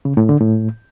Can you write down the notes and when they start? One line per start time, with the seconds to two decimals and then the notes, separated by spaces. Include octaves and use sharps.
0.05 C#3
0.17 A2
0.29 D3
0.41 A2